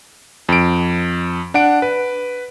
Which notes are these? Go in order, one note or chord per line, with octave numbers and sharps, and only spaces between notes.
F2 D7
D4 F#5 D7
B4